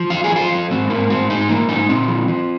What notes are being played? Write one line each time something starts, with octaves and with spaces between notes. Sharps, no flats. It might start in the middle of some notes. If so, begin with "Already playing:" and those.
Already playing: F3
F2 F4
G#4
F3
F4
F2
G#2 C4
G#2 A#3
G#2 C4
G#2 D#4
F3 A#3
G#2 D#4
A#2 C4
F3
F3